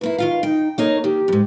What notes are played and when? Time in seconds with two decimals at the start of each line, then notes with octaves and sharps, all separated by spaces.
0.01 D#2 A#3 E4 B4
0.18 D#3 F4 F5
0.43 D#4 G5
0.78 A#3 D#4 A#4 C#5
1.04 D#3 G4
1.28 F2 G#2